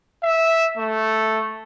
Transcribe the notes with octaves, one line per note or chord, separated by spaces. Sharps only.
E5
A3